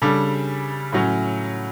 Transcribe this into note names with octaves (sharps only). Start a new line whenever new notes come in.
C#3 G3 D4 A4
A2 F#3 C#4